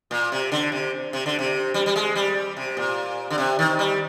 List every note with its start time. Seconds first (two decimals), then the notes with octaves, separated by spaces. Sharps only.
0.11 A#2
0.32 C3
0.52 D3
0.72 C3
1.13 C3
1.26 D3
1.39 C3
1.74 G3
1.86 G3
1.96 G#3
2.15 G3
2.57 C3
2.77 A#2
3.30 D3
3.38 C3
3.59 D#3
3.79 G3